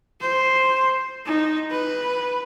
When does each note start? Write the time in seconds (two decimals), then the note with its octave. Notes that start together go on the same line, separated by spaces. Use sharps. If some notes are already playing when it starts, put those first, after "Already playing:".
0.21 C5
1.26 D#4
1.71 B4